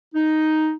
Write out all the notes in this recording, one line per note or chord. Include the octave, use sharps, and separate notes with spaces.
D#4